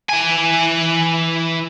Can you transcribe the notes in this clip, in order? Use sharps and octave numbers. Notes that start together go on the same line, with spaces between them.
E3 G#5